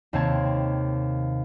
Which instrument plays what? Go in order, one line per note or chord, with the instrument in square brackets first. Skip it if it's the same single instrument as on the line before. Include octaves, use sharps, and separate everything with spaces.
[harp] D#2 C3 C4 C#5 A5 G#6